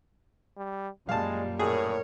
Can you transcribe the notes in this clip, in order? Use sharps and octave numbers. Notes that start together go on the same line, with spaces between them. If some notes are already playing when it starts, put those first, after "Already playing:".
G3
F#2 A#2 G3 G#3 F5 A5
A2 G#4 A#4 C#5